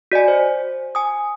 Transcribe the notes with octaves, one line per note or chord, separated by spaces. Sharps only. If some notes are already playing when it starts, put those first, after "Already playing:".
F#4 D5 D#5 G#5
C5
G#5 D#6